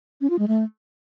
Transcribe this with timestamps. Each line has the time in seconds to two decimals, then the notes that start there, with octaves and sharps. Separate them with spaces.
0.21 C#4
0.30 F4
0.39 G#3
0.48 A3